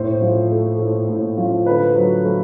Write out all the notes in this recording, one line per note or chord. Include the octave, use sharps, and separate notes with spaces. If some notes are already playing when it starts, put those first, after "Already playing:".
Already playing: A2 C5
F3
A3
A2
A2
F3
D3 B4
F#3
A3